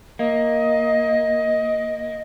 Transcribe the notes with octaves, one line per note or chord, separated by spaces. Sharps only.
A#3 D#5